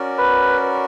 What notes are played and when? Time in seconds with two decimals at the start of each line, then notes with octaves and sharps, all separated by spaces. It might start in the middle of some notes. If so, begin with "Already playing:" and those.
Already playing: C#4 F#4 A#4 D5
0.19 B4